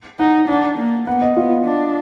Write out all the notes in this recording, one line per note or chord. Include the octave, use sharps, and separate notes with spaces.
D#4 F#5
D4 F#5
A#3
B3 F#5
D#5
B3 F4
D4